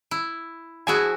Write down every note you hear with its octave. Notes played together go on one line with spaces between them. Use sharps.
E4
F3 E4 F#4 G#4 G#5